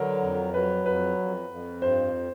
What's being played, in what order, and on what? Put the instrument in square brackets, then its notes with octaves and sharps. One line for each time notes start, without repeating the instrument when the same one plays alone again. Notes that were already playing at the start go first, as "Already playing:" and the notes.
Already playing: [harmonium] D3 F#3 [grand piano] A#4 B4
[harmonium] F2
[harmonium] F#3 [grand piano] B4
[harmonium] F2 [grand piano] B4
[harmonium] F2
F2
[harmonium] G2 [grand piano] C5